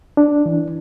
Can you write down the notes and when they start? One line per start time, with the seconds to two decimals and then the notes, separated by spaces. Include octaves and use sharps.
0.17 D4
0.46 E3